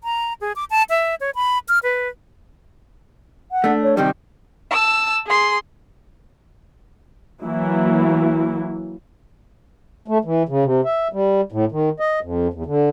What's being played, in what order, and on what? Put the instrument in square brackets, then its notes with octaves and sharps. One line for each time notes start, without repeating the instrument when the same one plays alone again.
[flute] A#5
G#4
D6
A5
E5
C#5
B5
F6
B4
[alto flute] F#5
[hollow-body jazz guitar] A3 D4
[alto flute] C#5
[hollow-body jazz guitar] C3 D#3 G3 [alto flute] G5
[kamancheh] A5 E6
G#4 C6
[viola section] E3 F#3 A#3 E4
[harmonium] A3
E3
C#3
C3
E5
G3
A2
D#3
D#5
F2
E2
D3